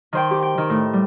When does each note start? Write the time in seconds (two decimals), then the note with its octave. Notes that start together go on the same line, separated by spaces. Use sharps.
0.13 D#3 C5 G5
0.31 G4
0.43 G5
0.58 D#3
0.70 A2
0.93 G3